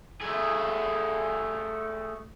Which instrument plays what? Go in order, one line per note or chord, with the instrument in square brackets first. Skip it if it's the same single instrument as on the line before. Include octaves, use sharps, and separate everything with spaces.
[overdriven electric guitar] A3 G#4